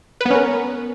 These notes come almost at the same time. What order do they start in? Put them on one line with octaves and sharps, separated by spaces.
B4 B3 C#4 A#4